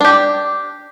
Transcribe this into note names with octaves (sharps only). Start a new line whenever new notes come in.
D4 G4